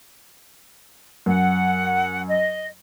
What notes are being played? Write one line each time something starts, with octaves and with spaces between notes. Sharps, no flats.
F#2 F#5
D#5